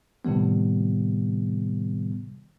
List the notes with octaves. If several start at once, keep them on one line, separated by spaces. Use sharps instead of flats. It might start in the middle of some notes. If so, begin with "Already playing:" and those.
A2 C3 D#3 G3 B3